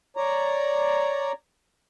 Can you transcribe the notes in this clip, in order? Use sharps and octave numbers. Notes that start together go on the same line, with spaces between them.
C#5 D5 A#5